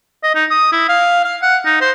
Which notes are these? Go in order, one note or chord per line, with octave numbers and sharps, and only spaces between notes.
D#5
D#4
D#6
E4
F5
F5
F#5
D#4
C5